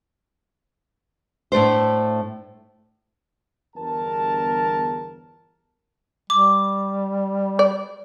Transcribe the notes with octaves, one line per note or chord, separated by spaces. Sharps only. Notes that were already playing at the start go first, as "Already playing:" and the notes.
A2 A3 D4 C5
G1 E2 A#4 A5
G3 D6
D5